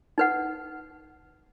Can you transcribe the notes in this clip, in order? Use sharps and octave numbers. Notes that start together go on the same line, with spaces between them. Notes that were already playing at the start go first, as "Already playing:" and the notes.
D#4 B4 F#5